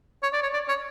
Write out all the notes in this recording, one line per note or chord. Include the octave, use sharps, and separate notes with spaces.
C#5
D5
C#5
D5
C#5